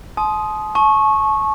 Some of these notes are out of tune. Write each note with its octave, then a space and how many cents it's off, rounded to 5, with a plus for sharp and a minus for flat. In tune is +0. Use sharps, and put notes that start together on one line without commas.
A5 -45 C6 +0 D#6 +0
A5 -35 C#6 -15